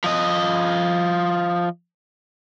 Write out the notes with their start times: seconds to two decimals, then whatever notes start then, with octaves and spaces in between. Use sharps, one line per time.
0.04 F3 D#5